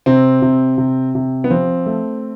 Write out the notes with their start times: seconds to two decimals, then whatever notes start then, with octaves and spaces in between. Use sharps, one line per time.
0.06 C3 C4
0.42 C3
0.78 C3
1.15 C3
1.44 B3
1.50 F3 C4
1.86 A3